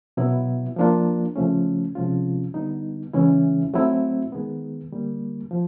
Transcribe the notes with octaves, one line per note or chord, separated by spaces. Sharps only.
B2 F#3 B3 E4
F3 A#3 D4 F4
C#3 F3 A3 C#4
C3 F3 G#3 C#4 F4
D3 G3 B3 D#4
C#3 E3 G#3 C#4 E4
F#3 A3 C4 E4
D#3 G#3 B3
D3 G3 A#3
F3